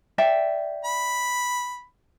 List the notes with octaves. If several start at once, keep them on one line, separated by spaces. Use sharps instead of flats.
D5 E5 G5
B5